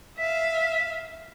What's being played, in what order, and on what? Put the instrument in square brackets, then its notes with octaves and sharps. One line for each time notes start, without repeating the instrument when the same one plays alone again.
[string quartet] E5 F5 [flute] B6